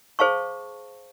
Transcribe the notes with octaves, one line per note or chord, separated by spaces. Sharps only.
G#4 C5 F5 A5 C#6